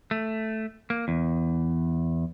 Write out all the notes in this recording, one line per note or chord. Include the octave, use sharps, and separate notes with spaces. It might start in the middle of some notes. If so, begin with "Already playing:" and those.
A3
A#3
E2